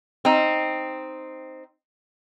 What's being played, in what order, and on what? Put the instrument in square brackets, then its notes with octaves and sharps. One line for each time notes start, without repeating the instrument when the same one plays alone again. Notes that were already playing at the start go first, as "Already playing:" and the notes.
[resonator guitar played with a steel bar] C4 D#4